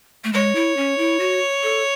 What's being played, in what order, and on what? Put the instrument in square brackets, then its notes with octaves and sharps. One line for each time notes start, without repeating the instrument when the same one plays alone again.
[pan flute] A3
[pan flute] G#3 [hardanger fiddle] C#5
[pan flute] E4
C#4
E4
F#4
A4